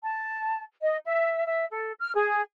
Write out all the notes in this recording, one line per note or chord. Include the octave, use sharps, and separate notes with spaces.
A5
D#5
E5
E5
A4
F6
G#4